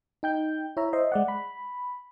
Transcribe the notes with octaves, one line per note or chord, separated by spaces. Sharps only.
D#4 G5 G6
E4 C#5 E5 A#5
C5 D#5 E5 C6
G#3 D5 F#5
B5